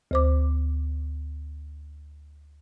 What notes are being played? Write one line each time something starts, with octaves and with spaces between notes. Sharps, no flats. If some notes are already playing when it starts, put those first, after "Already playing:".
D2 C5 D6